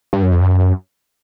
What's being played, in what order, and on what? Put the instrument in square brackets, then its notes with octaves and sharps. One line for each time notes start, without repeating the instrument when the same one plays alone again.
[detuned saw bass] G2
F#2
F2
F#2